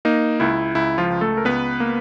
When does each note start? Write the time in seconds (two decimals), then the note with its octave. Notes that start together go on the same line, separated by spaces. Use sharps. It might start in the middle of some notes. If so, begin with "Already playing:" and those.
0.05 A#3 D#4
0.40 C#2 E4
0.75 C#2 E4
0.98 F3 F4
1.10 C#2
1.21 A3 A4
1.37 A#4
1.45 C#2 B3 B4
1.80 A#3